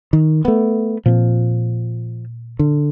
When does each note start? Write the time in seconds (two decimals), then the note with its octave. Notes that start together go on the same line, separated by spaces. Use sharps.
0.13 D#3
0.45 A3 B3
1.06 A#2 F3 C4
2.59 D3